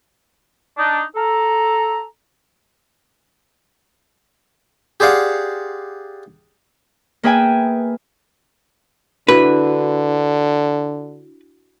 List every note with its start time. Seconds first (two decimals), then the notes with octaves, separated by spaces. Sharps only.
0.77 D4 D#4
1.16 A4 A#5
5.00 G4 G#4 C5 D5 F5 F#5
7.23 A#3 G#4 B4 E5 G5 G#5
9.28 D3 D4 E4 F#4 B4